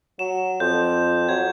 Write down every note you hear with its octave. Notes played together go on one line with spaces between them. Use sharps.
F#3 E7
F2 G6
F#3 G#6